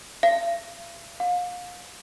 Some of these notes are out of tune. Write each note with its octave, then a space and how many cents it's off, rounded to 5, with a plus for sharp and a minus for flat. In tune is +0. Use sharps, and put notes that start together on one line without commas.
F5 -45
F5 +35